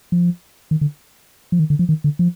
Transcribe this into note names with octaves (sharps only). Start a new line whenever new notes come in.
F3
D#3
D3
F3
D#3
D3
F3
D#3
D3
F3